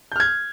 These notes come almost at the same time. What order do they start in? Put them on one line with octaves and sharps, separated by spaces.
G6 F6 G#6